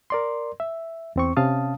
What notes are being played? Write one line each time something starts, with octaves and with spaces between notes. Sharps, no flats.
A#4 D5 C6
E5
E2 C4 C#6
C3 C#4 F5 A5 D#6